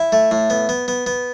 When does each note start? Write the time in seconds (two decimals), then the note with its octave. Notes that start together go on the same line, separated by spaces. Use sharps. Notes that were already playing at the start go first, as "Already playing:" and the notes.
Already playing: E4
0.12 A3
0.31 A2
0.50 B3
0.69 B3
0.88 B3
1.06 B3